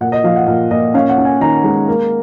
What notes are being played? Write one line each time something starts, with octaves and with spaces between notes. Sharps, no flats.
A#2 F#5
D#5
F3 F5
F#5
A#2 F5
A#2 D#5
C#4 F5
F#5
C#4
G#5
D#3 A#5
G#3
A#3